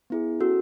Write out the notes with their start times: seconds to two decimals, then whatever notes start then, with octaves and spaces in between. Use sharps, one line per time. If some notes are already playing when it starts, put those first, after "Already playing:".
0.10 B3 E4 G#4
0.40 C#4 F#4 A4 E6